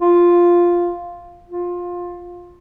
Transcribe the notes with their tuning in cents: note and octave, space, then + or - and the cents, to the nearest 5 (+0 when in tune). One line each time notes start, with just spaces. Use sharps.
F4 +0
F4 +15